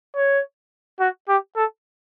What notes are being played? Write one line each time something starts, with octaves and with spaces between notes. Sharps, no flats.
C#5
F#4
G4
A4